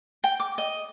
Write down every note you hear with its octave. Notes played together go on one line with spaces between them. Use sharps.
G5
D6
D#5